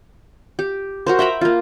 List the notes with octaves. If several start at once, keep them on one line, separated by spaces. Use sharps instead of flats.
G4
F#4 A#4 C5
E5 G5 A#5 B5
A#3 F4